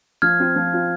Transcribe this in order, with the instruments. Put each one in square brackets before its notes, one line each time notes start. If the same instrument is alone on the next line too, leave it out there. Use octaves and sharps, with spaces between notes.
[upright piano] F3 [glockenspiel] F6 G#6
[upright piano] C4 F4
F3
C4 F4